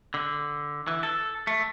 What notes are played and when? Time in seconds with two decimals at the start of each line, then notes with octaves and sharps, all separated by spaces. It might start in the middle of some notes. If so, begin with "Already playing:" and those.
0.14 D3
0.87 E3
1.03 A4
1.47 A3